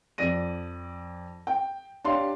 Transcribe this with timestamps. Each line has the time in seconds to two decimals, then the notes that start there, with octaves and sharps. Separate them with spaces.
0.18 F2 D5 A#6 D#7
1.47 G5
2.04 D4 G4 C#5 F5 C6